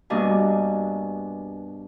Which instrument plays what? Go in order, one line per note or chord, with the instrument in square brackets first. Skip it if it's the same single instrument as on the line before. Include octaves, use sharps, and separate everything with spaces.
[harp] G2 B2 A#3 D4 D#5 G#5